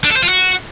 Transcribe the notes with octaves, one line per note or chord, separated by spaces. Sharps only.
D4
A4
C5
F4
F#4